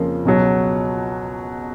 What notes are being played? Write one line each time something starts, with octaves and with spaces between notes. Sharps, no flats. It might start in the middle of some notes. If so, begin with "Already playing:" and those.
Already playing: F2 C#3 F3 A#3 C#4
C#2 B2 F#3